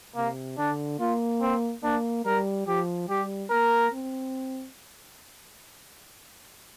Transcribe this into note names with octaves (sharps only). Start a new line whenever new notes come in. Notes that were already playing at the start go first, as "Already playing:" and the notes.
C3 A#3
D3 D4
A#3 F4
C4
A#3 D4
G3 A#4
F3 G4
G3 G4
A#3 A#4
C4